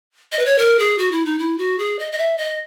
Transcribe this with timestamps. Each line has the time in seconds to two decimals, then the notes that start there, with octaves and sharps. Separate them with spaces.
0.32 D#5
0.39 B4
0.45 C#5
0.58 A#4
0.79 G#4
0.98 F#4
1.12 E4
1.25 D#4
1.39 E4
1.58 F#4
1.79 G#4
1.99 D#5
2.12 D#5
2.18 E5
2.38 D#5